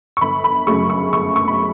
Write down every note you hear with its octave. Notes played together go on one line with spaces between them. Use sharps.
C#6
G1 B5
B5
F#2 C#3 F#3 A3 C#6
C#6
G1 C#6
C#6
B5